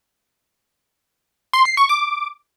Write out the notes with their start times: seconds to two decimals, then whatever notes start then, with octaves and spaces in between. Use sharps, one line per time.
1.53 C6
1.65 C7
1.77 C#6
1.89 D6